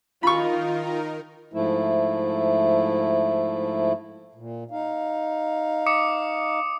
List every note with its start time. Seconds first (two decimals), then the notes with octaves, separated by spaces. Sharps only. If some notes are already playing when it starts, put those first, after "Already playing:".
0.23 D#3 D#4 F4 A#4 B5 C#6
1.54 G#2 F3 A3 E4
4.35 A#2
4.71 D#4 F5
5.87 D6 D#6 C#7